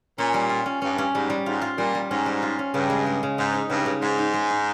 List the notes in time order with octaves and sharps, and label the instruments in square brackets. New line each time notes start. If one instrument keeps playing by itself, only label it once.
[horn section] A#2 [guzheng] C#4
[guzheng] G3
F4
C#4
[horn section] G2 [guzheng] C#4
[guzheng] C#4
[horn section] G#2 [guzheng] G3
[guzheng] G3
[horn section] G#2 [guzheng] F4
[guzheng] F4
[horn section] A#2 [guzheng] G3
[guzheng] G3
[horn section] G#2 [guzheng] C#4
[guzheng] G3
F4
C#4
[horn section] G2 [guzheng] C#3
[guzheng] G#3
G#3
C#3
[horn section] G#2 [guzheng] D#4
[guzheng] D#4
[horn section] G2 [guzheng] C#3
[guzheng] C#3
[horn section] G#2 [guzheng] D#4
[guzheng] D#4
G#3
D#4